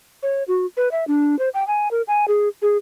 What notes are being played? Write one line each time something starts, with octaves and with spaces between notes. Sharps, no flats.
C#5
F#4
B4
E5
D4
C5
G5
G#5
A#4
G#5
G#4
G#4